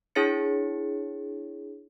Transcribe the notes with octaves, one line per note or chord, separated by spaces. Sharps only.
D4 E4 G#4 C#5 A6 C#7